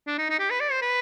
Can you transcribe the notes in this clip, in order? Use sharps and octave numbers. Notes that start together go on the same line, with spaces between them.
D4
D#4
D#4
G4
B4
D5
C5
B4